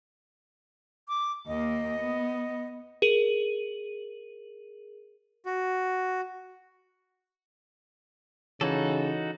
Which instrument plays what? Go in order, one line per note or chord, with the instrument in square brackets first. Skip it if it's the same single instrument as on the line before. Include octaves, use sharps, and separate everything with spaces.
[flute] D6
[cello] D#2 A#3 [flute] D#5
[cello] B3
[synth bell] G#4 A#4 D#7 F#7
[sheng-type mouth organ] F#4
[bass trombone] C#3 [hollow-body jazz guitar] E3 C#5 [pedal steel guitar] D#4 F#4 A4